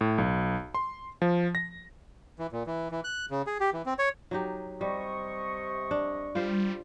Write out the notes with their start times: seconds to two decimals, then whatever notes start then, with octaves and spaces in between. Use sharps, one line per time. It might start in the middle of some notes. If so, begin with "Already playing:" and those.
0.01 A2
0.18 B1
0.75 C6
1.22 F3
1.55 A#6
2.39 E3
2.52 A#2
2.66 E3
2.91 E3
3.04 F#6
3.31 C#3
3.47 G#4
3.60 G4
3.73 E3
3.86 C4
3.99 C#5
4.31 F#3 D#4 G4
4.81 C3 G3 D#5 C#6
5.91 D4
6.35 G3 F4 C5